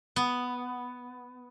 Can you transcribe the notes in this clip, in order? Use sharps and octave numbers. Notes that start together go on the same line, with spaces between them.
B3